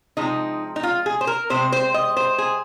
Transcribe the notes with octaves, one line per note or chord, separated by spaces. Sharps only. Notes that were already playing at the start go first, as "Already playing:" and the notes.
C3 F3 G#3 D#4
D#4
F4
G#4
C5
A#4
C3 G#3 C4 C5
C5
D#5
C5
G#4